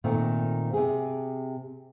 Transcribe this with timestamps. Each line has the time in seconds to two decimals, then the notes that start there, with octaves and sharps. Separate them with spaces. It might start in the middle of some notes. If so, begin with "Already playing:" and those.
0.04 A#2 D#3 A3 C4
0.73 C3 G#4